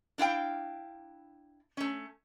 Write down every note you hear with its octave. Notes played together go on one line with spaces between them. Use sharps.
D4 E4 F5 G5
A3 C#4